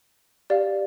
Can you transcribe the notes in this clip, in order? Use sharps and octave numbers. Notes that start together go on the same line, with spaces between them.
G4 D5 F5